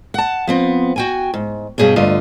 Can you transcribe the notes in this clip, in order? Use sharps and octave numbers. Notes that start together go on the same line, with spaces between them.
F#5 A5
F3 B3 C4
F#4 G5 G#5
G#2
G2 B2 G#4 C#5 G5
D2 G2 D3 F4 D#5